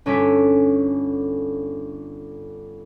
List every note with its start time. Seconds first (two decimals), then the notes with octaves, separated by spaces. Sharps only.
0.06 G1 C#4 A4 D6 B6